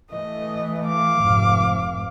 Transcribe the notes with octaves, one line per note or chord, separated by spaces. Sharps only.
E3 A3 D#5
F5 D6
F1 G#2